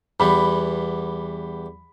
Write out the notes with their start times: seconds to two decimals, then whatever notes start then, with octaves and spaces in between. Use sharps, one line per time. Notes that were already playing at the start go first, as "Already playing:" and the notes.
0.20 E2 G3 B3 B5